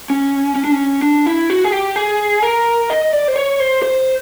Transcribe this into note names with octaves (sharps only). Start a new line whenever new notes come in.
C#4
C#4
D4
C#4
D4
E4
F#4
G#4
G4
G#4
A#4
D#5
D5
C5
C#5
C5
C5